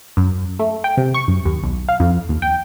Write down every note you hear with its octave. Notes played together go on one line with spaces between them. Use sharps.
F#2
A3
G5
C3
C#6
F#2
D#2
B1
F5
F2
D#2
G5